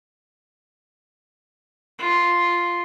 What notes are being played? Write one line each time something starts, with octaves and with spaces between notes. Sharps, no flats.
F4